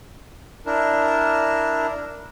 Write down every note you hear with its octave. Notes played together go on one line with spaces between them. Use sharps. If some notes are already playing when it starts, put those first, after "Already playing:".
D4 E4 A#4